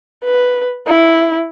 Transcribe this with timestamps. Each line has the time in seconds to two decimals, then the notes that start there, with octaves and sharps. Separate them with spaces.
0.24 B4
0.88 E4